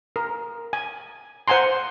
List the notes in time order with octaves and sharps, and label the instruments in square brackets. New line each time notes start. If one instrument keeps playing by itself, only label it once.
[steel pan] A#4
G#5
C5 F#5 G#5 A#5 C6